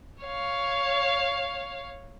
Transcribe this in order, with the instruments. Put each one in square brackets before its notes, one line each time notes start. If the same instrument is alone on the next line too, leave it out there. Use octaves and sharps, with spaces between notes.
[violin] C#5 F5